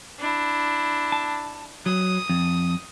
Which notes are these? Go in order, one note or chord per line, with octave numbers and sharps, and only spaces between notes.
D4 E4
A5
F#3 D#6
F2